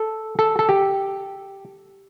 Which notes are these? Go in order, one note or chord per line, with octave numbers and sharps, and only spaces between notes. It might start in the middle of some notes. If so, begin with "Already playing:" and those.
Already playing: A4
A4
A4
G4